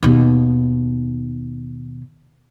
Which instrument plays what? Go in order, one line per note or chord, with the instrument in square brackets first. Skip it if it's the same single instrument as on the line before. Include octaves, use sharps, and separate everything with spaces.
[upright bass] D#2 B2